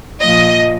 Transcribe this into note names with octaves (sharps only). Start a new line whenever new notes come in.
A#2 F3 D#5